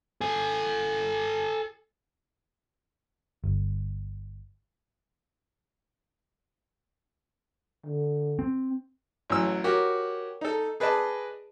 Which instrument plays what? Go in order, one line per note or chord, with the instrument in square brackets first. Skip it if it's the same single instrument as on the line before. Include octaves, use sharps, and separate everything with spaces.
[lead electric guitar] A4 G#5
[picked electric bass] G1
[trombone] D3
[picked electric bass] C4
[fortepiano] A1 E3 F#3 E6
F#4 G4 A#4 C#5
D#4 A4
G#4 B4 D5 D#5 A5